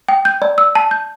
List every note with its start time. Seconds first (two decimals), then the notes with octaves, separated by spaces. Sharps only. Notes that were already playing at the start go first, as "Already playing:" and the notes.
0.09 G5
0.25 G6
0.42 D5
0.58 E6
0.75 A5
0.91 G6